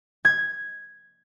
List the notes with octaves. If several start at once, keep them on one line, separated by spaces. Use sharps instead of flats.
G#6